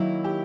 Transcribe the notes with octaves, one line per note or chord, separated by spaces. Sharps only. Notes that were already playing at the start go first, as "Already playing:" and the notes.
Already playing: D#3 F#3 A#3 D#4 E4
G4